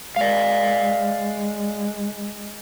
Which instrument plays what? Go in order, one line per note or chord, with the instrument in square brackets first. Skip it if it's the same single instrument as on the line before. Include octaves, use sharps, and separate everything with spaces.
[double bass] G#3 [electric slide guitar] D5 F5